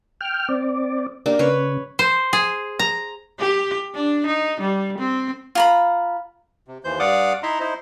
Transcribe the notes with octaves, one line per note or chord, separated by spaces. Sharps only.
G5 F6
C4 D5
A#3 D4 G4
C#3 B4 C#5
C5
G#4
A#5
G4
D4
D#4
G3
C4
F4 A#5 B5
C3
D#2 E3 C5 G6
G2 D5 F5 F#5 D6 D#6
D#4 E4 E5 A#5 C6
D#4 E4 C5